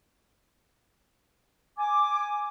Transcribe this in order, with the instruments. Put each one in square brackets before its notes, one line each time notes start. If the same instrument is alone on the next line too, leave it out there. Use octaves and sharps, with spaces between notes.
[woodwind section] G#5 D6